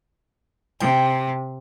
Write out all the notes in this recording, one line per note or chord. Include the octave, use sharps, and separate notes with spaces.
C3 G5